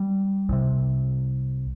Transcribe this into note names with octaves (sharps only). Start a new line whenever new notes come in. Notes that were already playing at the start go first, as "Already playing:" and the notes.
Already playing: G3
C2 C3